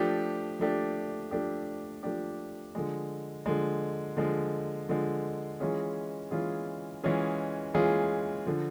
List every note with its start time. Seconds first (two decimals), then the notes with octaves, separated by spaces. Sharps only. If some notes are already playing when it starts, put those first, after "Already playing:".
Already playing: F3 A3 D4 G4
0.59 F3 A3 D4 G4
1.31 F3 A3 D4 G4
2.03 F3 A3 D4 G4
2.75 D3 F3 G#3
3.46 D3 F3 G#3
4.17 D3 F3 G#3
4.89 D3 F3 G#3
5.60 E3 G#3 C#4 F4 G#4
6.31 E3 G#3 C#4 F4 G#4
7.04 E3 G#3 C#4 F4 G#4
7.74 E3 G#3 C#4 F4 G#4
8.46 D3 F3